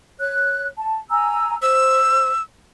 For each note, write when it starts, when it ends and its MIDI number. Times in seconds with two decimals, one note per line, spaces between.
0.19 0.67 73
0.19 0.67 90
0.77 1.00 81
1.10 1.56 80
1.10 1.56 82
1.10 1.56 88
1.62 2.29 72
1.62 2.42 88